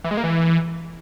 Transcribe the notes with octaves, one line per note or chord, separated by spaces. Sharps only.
E3
G#3
A#3
E3